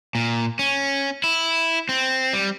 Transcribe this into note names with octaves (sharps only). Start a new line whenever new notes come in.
A#2
C#4
E4
C4
G3